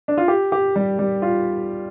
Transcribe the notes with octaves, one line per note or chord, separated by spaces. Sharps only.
D4
F4
G4
G4
G3
G3
F4